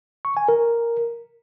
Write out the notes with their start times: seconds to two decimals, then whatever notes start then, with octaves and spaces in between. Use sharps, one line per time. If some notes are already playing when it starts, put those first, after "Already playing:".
0.25 C#6
0.37 G#5
0.49 A#4